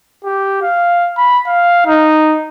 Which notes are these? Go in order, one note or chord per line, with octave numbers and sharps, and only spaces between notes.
G4
F5
B5
F5
D#4